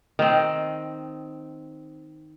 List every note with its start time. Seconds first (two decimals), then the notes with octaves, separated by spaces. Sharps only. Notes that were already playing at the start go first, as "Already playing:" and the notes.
0.19 D#3 C4